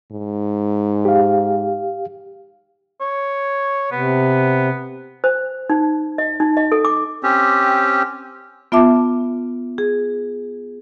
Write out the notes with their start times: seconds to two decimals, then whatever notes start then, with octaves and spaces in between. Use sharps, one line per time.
0.12 G#2
1.05 G4 F5
3.01 C#5
3.92 C3 B3
5.24 C5
5.70 D#4
6.18 D#5
6.40 D#4
6.57 D#5
6.72 A4
6.85 D6
7.23 C4 C#4 G4
8.72 B3 F4 E5 A5 D6
9.78 G#4